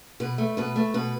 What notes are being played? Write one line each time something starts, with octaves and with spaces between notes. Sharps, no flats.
B2 B4
A3
B2 B4
A3
B2 B4